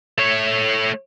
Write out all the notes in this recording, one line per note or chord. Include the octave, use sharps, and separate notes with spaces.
A3 C#5